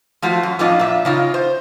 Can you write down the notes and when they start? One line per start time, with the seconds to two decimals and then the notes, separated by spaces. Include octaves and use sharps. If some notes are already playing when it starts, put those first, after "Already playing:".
0.22 F3 A3 F4 F#4
0.43 F#2
0.59 F2 A2 D4 F4 D#5
0.79 A#2 E5
1.05 C#3 D#4 F4
1.34 C5